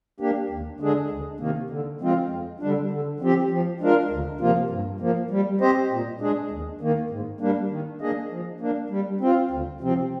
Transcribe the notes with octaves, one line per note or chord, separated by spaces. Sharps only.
A#3 D4 G4
D#2
D3 G#3 D4 G#4
D2
C3 D#3 A#3
D3
F3 G#3 C4 F4
F2
D3 G3 D4
D3
F3 C4 G4
F3
G#3 D4 F4 A#4
D2
C3 F3 A#3 F4
G2
F3 A#3
G3
C4 G4 C5 D#5
A#2
G#3 D4 G#4
D#2
D#3 A#3
G#2
G3 A#3 D4
D#3
A#3 D4 G#4 D#5
F3
A#3 D4
G3
C4 F4
D2
C3 F3 C4